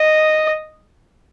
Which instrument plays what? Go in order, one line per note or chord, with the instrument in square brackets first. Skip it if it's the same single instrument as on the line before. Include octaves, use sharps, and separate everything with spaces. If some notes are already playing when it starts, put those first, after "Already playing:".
Already playing: [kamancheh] D#5